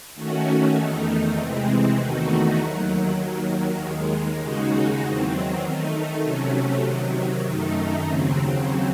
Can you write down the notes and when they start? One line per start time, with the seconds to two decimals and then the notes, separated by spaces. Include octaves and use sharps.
0.15 D#3 A3 C#4 F#4
0.76 E2 D#3 A3 D#4
1.36 C3 E3 G#3 C4
1.97 E2 D#3 A3 D#4 F#4
2.58 D#2 D#3 F#3
3.19 D#2 D#3 F#3
3.80 D#2 D#3 G#3
4.40 D#2 C#3 G#3 D#4 F#4
5.02 E2 D#3 F#3 C4
5.62 D#3 A3 D#4
6.23 C3 F#3 A3 C#4
6.84 C3 D#3 F#3
7.45 F#2 D#3 A3 D#4
8.05 D#2 C#3 F#3 C4